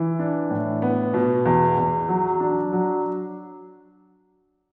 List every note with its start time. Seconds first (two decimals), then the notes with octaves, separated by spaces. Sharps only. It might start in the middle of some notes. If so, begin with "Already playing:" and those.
Already playing: E3
0.19 D4
0.50 A2
0.82 B3
1.14 B2
1.45 E2
1.78 E2
2.09 F#3
2.40 D4
2.73 F#3